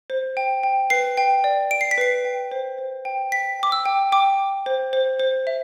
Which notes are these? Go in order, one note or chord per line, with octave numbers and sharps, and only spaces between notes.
C5
G5
G5
B4 C7
G5
D5
D5 D7
C7
B6
B4 C7
G5
C5
C5
G5
G5 B6
G5 D6
E6
G5
G5 D6
G5
C5
C5
C5
E5